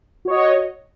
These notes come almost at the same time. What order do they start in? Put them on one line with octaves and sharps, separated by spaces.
F#4 C#5 D#5